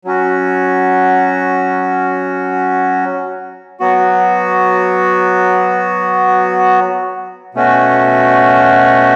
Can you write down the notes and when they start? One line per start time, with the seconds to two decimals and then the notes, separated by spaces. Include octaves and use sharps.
0.05 F#3 C#4 F#4
3.80 F#3 B3 F#4
7.55 B2 A3 C#4 F#4